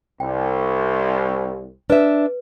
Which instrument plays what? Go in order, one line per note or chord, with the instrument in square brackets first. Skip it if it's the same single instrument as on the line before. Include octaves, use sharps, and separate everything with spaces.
[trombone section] C2 [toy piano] G5
[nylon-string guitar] D4 E5 [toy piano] B4